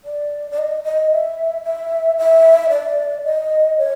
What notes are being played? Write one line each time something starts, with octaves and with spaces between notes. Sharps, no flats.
D5
D5
D#5
D#5
E5
E5
E5
D5
D#5
C#5